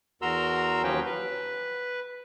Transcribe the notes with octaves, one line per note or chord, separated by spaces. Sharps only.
E2 F#4 A#4 A#5 C6 E6
D#2 F3 F#3 C#4 B4 G5
B4